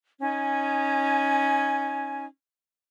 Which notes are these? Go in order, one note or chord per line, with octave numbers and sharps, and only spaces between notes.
C#4 D#4 G#5